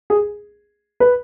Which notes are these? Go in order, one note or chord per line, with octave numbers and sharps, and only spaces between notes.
G#4
B4